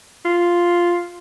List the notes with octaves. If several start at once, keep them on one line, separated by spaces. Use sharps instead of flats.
F4